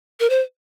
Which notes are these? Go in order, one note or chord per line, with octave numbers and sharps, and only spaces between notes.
A#4
C5